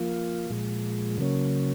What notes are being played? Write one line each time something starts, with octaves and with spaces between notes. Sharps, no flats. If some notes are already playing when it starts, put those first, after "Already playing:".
Already playing: F3 A#3 F4
A#2 F3 G#3
C#3 F#3 A#3 C#4